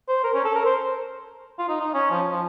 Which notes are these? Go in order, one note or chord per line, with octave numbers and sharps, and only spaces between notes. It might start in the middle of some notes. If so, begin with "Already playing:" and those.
C5
A#4
C#4
A4
A#4
C5
F4
D#4
D#4
C#4
F3
F3